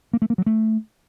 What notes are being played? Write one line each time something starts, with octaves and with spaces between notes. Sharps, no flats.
A#3
A3
A#3
F#3
A3